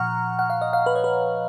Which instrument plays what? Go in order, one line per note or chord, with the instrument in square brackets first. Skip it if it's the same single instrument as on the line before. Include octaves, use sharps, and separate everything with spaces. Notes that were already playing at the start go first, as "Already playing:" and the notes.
Already playing: [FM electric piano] A#2 F3 F#5 A#5 C#6 F6
F#5
F5
D#5
F5
B4
C#5
B4